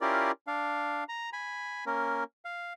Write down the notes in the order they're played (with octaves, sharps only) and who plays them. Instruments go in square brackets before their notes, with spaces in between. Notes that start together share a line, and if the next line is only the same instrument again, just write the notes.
[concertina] C#4 E4 F4 G4 A#4 D5
D4 F5
A#5
G#5 B5
A#3 C#4 A#4
F5